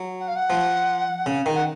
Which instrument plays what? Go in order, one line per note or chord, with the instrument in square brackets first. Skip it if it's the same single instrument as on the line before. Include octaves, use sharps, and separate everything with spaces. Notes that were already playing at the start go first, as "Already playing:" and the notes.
Already playing: [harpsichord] F#3
[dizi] F#5
F5
F#5
[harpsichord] F3
C#3
D#3
[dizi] F#5